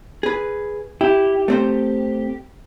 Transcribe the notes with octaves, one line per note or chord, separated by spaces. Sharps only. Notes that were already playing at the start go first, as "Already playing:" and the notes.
G#4 B4
E4 G4
A3 C4 C5